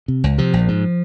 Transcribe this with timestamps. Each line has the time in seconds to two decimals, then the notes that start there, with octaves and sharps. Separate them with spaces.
0.08 C3
0.24 C#2
0.38 C3 F3
0.53 A#1
0.68 G#2